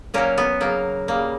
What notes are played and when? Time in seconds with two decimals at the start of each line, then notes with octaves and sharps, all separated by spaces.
0.14 A#2 F#3 A#3 C#4
0.38 B3
0.60 C#3 F#3 A#3
1.08 C#3 G3 A#3